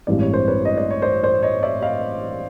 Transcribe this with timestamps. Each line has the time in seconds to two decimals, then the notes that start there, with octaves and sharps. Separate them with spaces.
0.07 A1 G2 E3 G#3 C4 D5
0.20 C#5
0.33 C5
0.47 B4 C#5
0.65 D#5
0.77 D5
0.90 C#5
1.02 C5 D5
1.23 C5 D5
1.43 C#5 D#5
1.63 D5 E5
1.82 D#5 F5